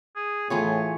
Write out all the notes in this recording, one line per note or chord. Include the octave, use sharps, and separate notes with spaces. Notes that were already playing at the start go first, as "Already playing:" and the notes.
G#4
A2 E3 F4 G#4 C#5